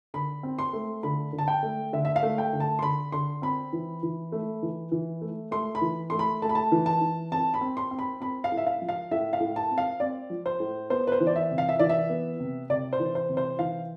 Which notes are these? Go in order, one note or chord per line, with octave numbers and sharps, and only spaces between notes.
D3 B5
C4
C6
A3
D3 B5
D3
A5
G5
A3
D3 E5
E5
F5
A3
G5
D3
A5
C6
D3 B5
D3 C6
C4 B5
E3
E3
A3
E3
E3
A3
A3 C6
B5
E3
A3 C6
B5
A3 A5
B5
A5
E3
A5
E3
C4 A5
B5
C4
C6
C4
B5
C4 B5
F5
A2
E5
F5
F3
F5
A2 E5
F5
A2
A5
C4
F5
C4 D5
F3
C5
A2
B3 C5
B4
C5
E3
D5
E5
C3
F5
E5
E3 D5
E5
B3
C3
C3 D5
C5
E3
C5
C3
C5
E3 F5